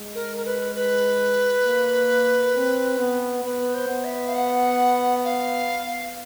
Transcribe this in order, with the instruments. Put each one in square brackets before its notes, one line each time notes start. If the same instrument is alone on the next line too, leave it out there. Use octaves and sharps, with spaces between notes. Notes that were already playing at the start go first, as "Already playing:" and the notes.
Already playing: [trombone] G#3
[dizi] A#4
A#4
B4
B4
[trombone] A#3
C4
B3
[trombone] B3 [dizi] B4
[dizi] C5
[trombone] B3
[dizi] E5
F5
F#5
F5